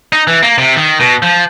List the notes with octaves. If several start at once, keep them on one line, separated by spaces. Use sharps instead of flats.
D#4
E3
A#3
C3
D#3
B2
F3